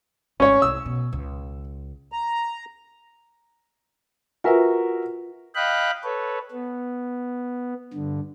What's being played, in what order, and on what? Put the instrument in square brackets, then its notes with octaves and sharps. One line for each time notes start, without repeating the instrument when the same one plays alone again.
[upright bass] G#1 [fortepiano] C#4 C#5
[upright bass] C2 [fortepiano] E6
[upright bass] B2
C#2
[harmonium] A#5
[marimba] F4 B4 G#5 [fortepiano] F#4 A#4 E5
[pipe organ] D#5 F5 G5 B5 F#6
A4 B4 C#5
B3
G2 D3